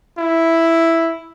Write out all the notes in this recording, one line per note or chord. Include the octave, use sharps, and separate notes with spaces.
E4